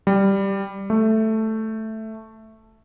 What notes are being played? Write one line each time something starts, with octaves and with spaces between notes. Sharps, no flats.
G3
A3